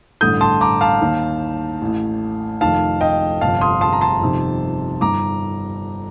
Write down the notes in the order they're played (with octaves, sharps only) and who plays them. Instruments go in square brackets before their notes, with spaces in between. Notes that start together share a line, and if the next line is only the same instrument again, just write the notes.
[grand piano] A1 G2 D3 D#6 G6
A5 C6
A#5 D6
F5 A5
D#2 D#3
A1 A2
F1 F2 D#3 F5 A5
D#5 G5
G1 F2 C3 F5 A5
C6 D#6
A5 C6
A#5
A5 C6
G1 F2 C3 D#3
G1 G2 D#3 A#5 D6